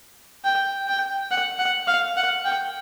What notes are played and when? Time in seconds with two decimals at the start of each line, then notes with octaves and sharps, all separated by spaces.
0.44 G5
0.87 G5
1.31 F#5
1.59 F#5
1.87 F5
2.17 F#5
2.45 G5